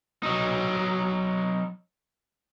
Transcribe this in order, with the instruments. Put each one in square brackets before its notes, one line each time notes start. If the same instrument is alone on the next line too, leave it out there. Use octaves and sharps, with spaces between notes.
[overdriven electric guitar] F#3 D#4